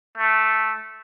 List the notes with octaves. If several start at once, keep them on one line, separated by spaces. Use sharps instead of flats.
A3